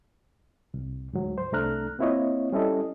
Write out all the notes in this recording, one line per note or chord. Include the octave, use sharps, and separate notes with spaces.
C2
D2 G#2 F#3
C5
C2 A3 D4 A#5 F6 F#6
A#3 C4 E4 F4 C#5 D#5
G3 C#4 E4 A4 D#5